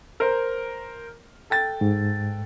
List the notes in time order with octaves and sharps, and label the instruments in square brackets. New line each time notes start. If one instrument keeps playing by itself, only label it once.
[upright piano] A#4 C5
A4 G5 A6
[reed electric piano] G#2